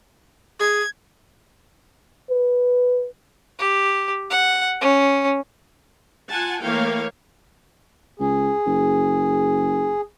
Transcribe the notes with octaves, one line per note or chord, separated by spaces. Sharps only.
G#4 G#6
B4
G4
F#5
C#4
F4 F#5 G#5 A5
E3 A3 A#3 C#5 F5 G5
C#2 G#4
F#1